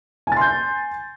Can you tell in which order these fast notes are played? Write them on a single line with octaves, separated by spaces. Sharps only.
G#5 A6 C6 G6